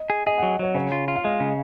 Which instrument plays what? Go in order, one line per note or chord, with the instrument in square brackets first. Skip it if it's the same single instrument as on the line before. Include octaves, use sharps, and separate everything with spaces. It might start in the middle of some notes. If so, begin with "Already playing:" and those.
Already playing: [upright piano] D#5
[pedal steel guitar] G#4
[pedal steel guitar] G#4 [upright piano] D#5
[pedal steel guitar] F#3 [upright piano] F#5
[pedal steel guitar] F#3 [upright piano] C#5
[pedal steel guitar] C#3 [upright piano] C#5
[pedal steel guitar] F4
F4
[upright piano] F5
[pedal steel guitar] G#3 [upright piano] D#5
[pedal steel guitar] C#3